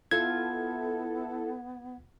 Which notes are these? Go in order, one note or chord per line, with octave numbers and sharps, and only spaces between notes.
B3 E4 F4 A4 G#6